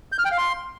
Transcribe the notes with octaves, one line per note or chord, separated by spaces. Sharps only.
G6
F6
G5
F5
C6